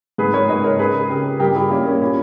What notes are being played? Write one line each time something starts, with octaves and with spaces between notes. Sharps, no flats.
G#2 G#4 B4
A#4 C#5
G#2 B4 D#5
A#4 C#5
C#3 G#4 B4
C#3 G4 A#4
G2 G4 A#4
E4 G#4
G3 A#3 C#4
A#3 C#4
A#2 C#4 E4